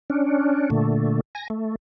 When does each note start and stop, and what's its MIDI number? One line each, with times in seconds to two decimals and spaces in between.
0.10 0.70 61
0.10 0.70 62
0.70 1.20 46
0.70 1.20 50
0.70 1.20 57
1.35 1.48 80
1.35 1.48 94
1.50 1.76 57